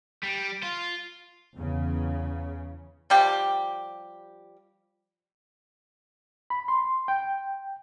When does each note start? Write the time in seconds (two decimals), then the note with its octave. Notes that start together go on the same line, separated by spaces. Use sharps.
0.23 G3
0.63 F4
1.56 E2 C#3
3.10 F3 G3 G4
6.50 B5
6.68 C6
7.08 G5